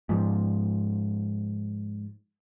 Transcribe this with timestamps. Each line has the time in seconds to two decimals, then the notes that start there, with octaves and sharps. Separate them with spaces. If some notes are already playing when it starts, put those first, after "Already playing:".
0.09 G#2 F3